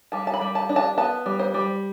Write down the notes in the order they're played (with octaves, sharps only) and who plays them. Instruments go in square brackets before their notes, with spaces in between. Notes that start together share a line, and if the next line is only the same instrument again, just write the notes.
[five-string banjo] G3 A5
A5
B5
G3
A5
D4
A5
B3 A5
G3
C5
G3